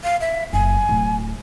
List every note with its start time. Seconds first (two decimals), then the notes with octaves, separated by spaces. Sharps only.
0.04 F5
0.21 E5
0.53 F#1 G#5
0.89 D1